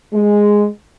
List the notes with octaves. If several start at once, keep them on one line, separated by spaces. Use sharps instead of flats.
G#3